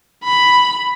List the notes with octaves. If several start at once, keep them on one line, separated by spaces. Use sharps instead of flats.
B5